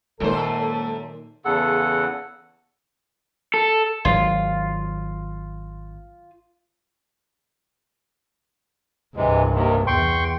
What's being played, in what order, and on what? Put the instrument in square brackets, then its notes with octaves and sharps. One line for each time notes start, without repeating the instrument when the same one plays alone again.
[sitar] F#2 C5 [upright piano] A#2 D#3 [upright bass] G#3 A#3 [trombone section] A4
[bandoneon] E2 C#3 A4 F#5
[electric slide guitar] A4
[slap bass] G#1 F#3 [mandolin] F4
[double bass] C2 G2 [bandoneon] C3 E3 G#3
[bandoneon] D#2 C3 D#3
[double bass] E2 [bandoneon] G5 C6 C#6